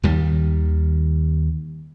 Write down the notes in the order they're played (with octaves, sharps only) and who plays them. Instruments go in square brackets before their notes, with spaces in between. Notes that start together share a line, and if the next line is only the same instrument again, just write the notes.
[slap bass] D#2 D#3 G3